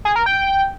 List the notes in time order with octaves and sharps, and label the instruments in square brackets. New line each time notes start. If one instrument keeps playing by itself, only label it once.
[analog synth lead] G#4
A#4
G5